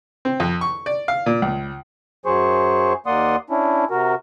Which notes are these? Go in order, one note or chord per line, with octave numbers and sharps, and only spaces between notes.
C4
F2
C#6
D5
F5
A#2
C#2
F#2 F#3 G#4 C5 C#6
D#2 A#3 D5 F#5 C6 D#6
C#4 D4 E4
C3 F#4 A#4